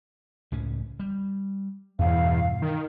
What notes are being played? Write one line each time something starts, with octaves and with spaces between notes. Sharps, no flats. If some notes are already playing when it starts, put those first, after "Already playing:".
C#2 A2 C#4
G3
E2 G2 B2 F5
D#3